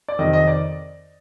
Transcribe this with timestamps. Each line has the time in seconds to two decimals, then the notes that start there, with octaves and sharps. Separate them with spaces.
0.08 D5
0.19 F2 C3 D#3 D#5
0.33 D#5
0.48 D5